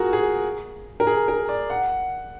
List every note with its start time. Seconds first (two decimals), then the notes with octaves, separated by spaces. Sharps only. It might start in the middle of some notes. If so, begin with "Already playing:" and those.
Already playing: F4 F#4 G#4 A#4
0.13 G#4
1.00 A#4
1.07 G#4
1.28 A#4
1.49 D5
1.70 F#5